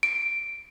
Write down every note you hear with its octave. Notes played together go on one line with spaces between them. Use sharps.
D7